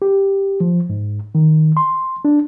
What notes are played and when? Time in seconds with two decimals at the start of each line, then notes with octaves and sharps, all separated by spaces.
0.02 G4
0.60 F3
0.90 G#2
1.35 D#3
1.77 C6
2.25 D4